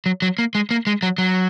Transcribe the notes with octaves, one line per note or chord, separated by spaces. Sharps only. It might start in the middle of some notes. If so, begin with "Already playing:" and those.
F#3
F#3
A#3
G#3
A#3
G#3
F#3
F#3